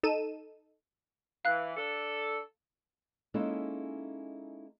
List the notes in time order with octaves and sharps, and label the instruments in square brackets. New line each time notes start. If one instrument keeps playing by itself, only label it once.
[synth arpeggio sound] D#4 A4 D#7 E7
[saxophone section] E3 [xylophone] F5 F#6
[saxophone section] D4 A4
[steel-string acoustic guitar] G#3 A#3 C#4 D#4 E4 A4